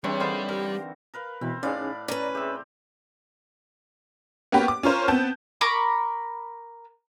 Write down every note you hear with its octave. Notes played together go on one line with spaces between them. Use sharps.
E3 G3 C4 D4 G#4 C#5
D3 E3 D#4 F4 C5
G4 A#4
A#4 B4 F5
B2 E3 C4 B5
A2 C#4 D#4 G#4 B4 D5 F5
C#4 B4 D5 A#5
C4 G4 G#4 E5 E6
A#3 B3 C#4 F#4 G4 B4
D6
C#4 F4 A#4 C5
B3 C4 A5 G6
A#4 B5 C#6 D6